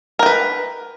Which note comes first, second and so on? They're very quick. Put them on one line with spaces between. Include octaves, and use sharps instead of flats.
A#4 G5 B4